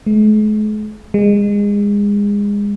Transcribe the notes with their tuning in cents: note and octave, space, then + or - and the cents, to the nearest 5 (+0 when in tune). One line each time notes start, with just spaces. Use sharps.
G#3 +45
G#3 -25